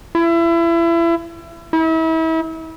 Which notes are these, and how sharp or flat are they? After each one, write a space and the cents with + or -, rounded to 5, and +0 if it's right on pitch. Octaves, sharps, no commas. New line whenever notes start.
E4 +30
E4 -35